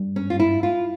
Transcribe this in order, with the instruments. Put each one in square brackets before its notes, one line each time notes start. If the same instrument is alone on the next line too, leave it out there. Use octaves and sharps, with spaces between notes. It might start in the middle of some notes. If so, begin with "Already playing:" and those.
Already playing: [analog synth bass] G2
[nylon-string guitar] C#4
F4
E4
F4